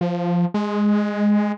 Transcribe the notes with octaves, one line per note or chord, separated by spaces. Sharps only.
F3
G#3